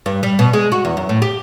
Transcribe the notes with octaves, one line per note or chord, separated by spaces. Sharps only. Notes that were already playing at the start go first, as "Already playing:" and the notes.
G2
G3
B2
G#3
F#4
E2
F#2
A2
G4